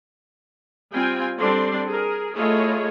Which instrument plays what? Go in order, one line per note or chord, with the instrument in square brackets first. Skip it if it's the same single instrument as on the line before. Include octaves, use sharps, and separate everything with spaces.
[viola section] G3 C4 F4 G5 G#5
G3 C4 D4 A4 D5 C6
G#4 A#4
A3 E4 F4 G#4 C#5 D#5